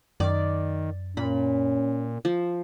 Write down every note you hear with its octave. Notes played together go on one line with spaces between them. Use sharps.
F#2 D#3 D5
A#2 C#4 B5
F3